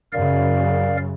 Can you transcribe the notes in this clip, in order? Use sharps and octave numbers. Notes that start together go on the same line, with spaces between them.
F#2 C#3 A#4 D5 F5